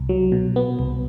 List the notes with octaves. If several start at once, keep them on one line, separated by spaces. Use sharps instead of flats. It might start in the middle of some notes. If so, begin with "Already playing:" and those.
Already playing: C2
F#3
B2
B3
C2